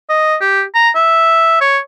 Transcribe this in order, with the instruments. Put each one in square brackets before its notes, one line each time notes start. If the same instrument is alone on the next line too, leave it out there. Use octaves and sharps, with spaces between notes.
[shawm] D#5
G4
A#5
E5
C#5